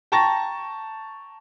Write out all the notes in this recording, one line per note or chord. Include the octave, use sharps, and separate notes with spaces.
G5 A5 A#5 C#6 A6 A#6